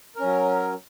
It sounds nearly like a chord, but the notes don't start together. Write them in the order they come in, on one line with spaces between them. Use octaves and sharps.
A#4 C#4 F#3